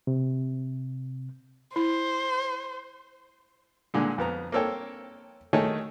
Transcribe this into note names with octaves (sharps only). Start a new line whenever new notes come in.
C3
E4 C5
A#2 D3 G#3
F2 B3 A#5
A#3 C4 A4 C#5 G5
D#3 A3 G#4 A4 C#5 D#5